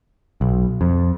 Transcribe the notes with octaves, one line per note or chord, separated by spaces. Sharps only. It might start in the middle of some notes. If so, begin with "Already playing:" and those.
B1
F2